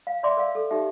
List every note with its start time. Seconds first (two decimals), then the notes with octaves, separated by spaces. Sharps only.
0.07 F5
0.23 D5 E5 C6 D6
0.37 A#4 F5
0.55 A4
0.71 D#4 G4 A4 E5